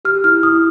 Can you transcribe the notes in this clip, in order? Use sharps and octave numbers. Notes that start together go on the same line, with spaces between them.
G4 F6
E4 F6
E4 D#6